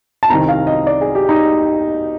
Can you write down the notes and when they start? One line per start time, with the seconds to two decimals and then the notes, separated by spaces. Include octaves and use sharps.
0.23 A5
0.30 C2 C3 D#3 A#5
0.48 F5
0.67 D#5
0.87 D5
1.01 G#4
1.15 G4
1.29 D#4